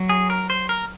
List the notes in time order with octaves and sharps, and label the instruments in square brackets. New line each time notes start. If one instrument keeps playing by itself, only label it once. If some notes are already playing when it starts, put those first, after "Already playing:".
Already playing: [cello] F#3
[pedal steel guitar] G#4
A#4
C5
A#4